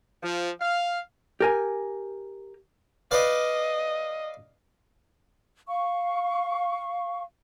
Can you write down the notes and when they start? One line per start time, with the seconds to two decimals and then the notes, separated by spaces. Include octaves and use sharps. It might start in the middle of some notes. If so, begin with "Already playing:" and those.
0.23 F3
0.61 F5
1.41 G4 A#4 G#5
3.11 B4 D5 D#5 F5
5.68 F5 C#6